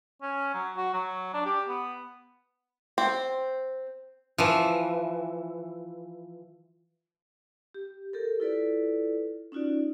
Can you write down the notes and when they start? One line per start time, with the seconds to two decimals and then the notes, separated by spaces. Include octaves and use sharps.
0.22 C#4
0.54 F#3
0.76 F#4
0.94 F#3
1.34 D4
1.45 G4
1.68 B3
2.98 C4
4.38 E3 F3
7.74 G4
8.13 G4 A4 A#4
8.40 E4 F4 A4 B4 D5
9.52 C#4 D#4 F4 F#4 D5